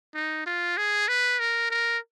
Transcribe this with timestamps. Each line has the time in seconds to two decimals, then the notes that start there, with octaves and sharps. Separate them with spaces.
0.15 D#4
0.46 F4
0.77 G#4
1.08 B4
1.40 A#4
1.71 A#4